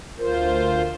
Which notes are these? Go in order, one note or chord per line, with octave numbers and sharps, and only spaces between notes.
D2 F4 A#4 C5